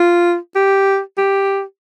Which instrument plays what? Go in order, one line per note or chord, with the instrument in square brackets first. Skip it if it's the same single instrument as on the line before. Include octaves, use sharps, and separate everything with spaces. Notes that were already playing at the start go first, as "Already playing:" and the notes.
Already playing: [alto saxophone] F4
G4
G4